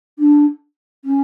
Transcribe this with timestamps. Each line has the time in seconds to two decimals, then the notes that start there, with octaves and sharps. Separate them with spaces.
0.19 D4
1.05 C#4